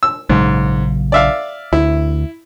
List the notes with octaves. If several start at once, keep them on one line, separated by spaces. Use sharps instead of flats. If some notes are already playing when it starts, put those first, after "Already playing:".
E6
A#1 G#2 C#3 F#3
D5 E5 F5
D2 E4